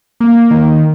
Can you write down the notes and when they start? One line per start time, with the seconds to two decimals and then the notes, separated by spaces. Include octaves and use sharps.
0.21 A#3
0.51 D#3